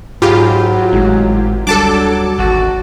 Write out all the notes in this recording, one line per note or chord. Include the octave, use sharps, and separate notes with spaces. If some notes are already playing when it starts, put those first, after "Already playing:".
G#2 F#3 F4 G4 G#4 B5
G#1 A2 G#3 E4
D2 F#3 G3 D4 A4 A5 D6
G#1 E2 F#4 A6